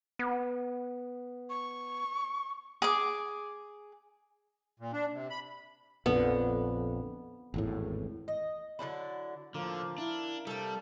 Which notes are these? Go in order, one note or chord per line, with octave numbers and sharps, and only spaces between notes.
B3
C#6
G#4 D6
A#2
D4
C3
B5
A#1 F2 D3 B3
G#1 E2 A2
D#5
D3 F#3 D4 E4
A2 D3 F3 A#3
D4 E4
C3 G3 A3 A4